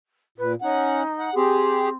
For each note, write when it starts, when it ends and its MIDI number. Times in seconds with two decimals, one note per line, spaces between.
0.38 0.55 46
0.38 0.52 71
0.62 1.03 61
0.62 1.30 63
0.62 1.03 78
1.19 1.34 78
1.35 1.95 60
1.35 1.89 67
1.35 1.89 68